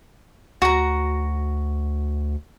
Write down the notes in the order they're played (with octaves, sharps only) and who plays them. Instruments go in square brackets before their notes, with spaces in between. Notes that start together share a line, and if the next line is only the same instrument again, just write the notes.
[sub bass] D2 [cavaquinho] F#4 A#5